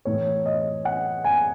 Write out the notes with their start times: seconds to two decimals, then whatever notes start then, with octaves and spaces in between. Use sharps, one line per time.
0.05 A2 E3 C#5
0.46 D#5
0.85 F#5
1.24 G#5